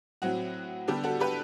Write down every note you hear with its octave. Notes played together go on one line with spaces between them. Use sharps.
A2 F#3 C4 F#4
D3 G3 B3 D4 G4
F#4 A4
G4 B4